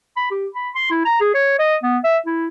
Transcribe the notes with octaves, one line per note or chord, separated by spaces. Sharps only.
B5
G4
B5
C6
E4
A#5
G#4
C#5
D#5
B3
E5
E4